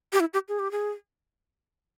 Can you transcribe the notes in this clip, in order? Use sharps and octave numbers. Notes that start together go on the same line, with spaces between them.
G4
E4
G4
G#4
G4
G#4